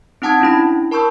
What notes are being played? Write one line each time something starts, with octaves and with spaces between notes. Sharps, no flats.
C4 D#4 F#5 A5 D#6 G#6
C#4 D4 E4 B5
A#4 A5 B5 C#6 E6 G6